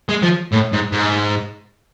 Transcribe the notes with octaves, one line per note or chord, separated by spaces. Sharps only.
G#3
F3
A2
G#2
G#2